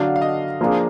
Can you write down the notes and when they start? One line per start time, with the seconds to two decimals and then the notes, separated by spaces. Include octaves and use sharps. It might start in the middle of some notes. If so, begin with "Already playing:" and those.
Already playing: D3 F#3 D4 F#4 F5
0.16 F5
0.22 D#5
0.61 F3 A#3 D4 G#4